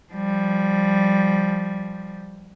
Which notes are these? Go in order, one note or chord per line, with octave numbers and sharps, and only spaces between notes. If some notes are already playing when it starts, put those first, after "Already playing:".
F3 G3